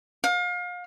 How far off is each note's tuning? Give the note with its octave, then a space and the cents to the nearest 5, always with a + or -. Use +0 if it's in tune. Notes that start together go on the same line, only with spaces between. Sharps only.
F5 +35